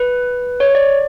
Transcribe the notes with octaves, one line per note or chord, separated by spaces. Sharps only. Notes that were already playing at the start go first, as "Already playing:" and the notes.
Already playing: B4
C#5
D5